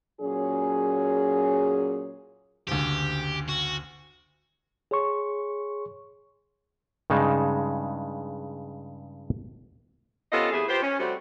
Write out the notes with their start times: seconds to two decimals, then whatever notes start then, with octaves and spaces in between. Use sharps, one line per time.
0.21 A#2 F#3 C#4 G#4
2.68 F#1 D2 G4
3.49 F#4
4.91 G#4 C#5 C6 C#6
7.10 G2 C#3 G#3 D#4 A5
10.32 C3 B3 C#4 F4 A4 D#5
10.52 E2 C3 A3 E4 G#4
10.69 F4 G4 B4 C5
10.82 C#4
10.98 C3 G3 A3 C4 F#4